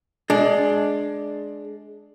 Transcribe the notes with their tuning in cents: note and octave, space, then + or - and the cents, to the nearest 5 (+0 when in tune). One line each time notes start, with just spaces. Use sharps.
G#3 +15 D4 +0